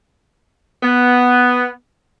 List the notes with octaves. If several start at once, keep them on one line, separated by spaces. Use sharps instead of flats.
B3